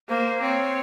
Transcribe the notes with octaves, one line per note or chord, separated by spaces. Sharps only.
A#3 C5
C4 C#5